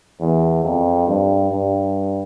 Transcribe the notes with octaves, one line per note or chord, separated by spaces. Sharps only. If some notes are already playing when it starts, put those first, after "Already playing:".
E2
F2
G2
G2